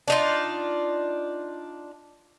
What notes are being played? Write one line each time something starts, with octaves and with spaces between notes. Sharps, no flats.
D4 D#4 F4